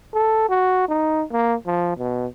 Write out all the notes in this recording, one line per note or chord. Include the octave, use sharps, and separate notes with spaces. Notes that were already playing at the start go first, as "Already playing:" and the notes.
A4
F#4
D#4
A#3
F3
B2